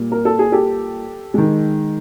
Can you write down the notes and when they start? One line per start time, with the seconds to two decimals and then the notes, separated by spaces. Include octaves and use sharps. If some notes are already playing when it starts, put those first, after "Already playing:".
Already playing: A#2 G3 A#3
0.12 A#4
0.25 A4
0.39 G#4
0.52 G4 A4
1.34 D#3 G#3